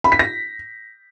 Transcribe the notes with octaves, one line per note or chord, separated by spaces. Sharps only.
B5
B6
A#6